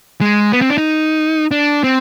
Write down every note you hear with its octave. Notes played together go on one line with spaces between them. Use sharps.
G#3
B3
C4
D4
D#4
D4
C4